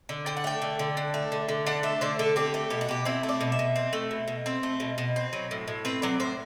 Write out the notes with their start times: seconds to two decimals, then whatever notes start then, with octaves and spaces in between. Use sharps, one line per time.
0.09 D3
0.26 D4 G5
0.37 F#5
0.44 A3 G5
0.62 D3
0.79 D3
0.97 D4
1.14 A3
1.32 D3
1.49 D3
1.66 D4 F#5
1.83 A3 E5
2.01 D3 C5
2.19 D3 A4
2.36 C4 G4
2.54 A3
2.70 B2 G4
2.81 F#4
2.89 B2 G4
3.05 C4 E4
3.23 A3
3.29 D5
3.41 B2
3.52 E5
3.59 B2
3.76 C4
3.93 A3
4.11 B2
4.28 B2
4.46 C4 C5
4.63 A3
4.80 B2
4.98 B2
5.16 C4
5.33 F#3
5.51 A2
5.68 A2
5.85 C4 B4
6.02 F#3 D5
6.20 A2 C5